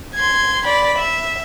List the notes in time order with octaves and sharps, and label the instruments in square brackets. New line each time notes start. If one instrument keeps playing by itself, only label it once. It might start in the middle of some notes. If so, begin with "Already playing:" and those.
[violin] C6 G#6
D5 B5
E5